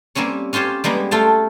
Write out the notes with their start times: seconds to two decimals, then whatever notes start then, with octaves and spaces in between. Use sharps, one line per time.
0.15 G3 A#3 C4 C#4 C#5
0.53 C#4 F4 G4 C5 C#5
0.84 G3 G#3 A#3 B3
1.11 A3 F4 A4 F5 G5 A5